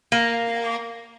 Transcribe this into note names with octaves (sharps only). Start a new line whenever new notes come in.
A#3